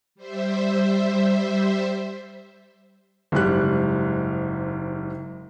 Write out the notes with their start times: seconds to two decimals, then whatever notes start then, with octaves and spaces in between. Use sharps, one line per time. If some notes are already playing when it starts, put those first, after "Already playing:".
0.15 G3 C5 E5
3.32 F#1 G#2 G3 F#6